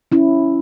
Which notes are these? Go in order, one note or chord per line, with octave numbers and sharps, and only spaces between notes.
C#4 E4